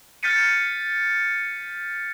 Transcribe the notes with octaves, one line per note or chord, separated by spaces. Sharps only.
F6 G6 A6 B6 C#7 D#7